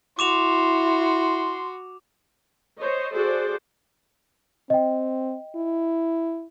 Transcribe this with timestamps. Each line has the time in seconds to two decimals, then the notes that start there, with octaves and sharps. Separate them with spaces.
0.19 E4 F#4 C6 D6 E7 F7
2.79 C5 C#5 D#5
3.13 F#4 G#4 A4 C5 D5
4.70 C4 D#5 G5
5.56 E4